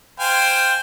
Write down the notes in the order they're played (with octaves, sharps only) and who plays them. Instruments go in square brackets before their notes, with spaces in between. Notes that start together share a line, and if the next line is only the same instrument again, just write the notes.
[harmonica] C5 F5 G#5 [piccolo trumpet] G5